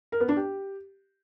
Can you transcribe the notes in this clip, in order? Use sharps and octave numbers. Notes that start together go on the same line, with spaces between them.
A#4
B3
D4
G4